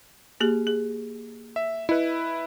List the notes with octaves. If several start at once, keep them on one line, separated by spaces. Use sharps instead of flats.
A#3 G4 G#4
G#4
E5
E4 B4 D#5